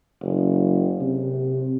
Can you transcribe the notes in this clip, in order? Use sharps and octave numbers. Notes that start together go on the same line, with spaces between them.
F#1
C3